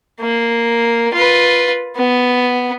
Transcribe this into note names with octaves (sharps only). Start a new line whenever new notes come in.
A#3
F4 B4
B3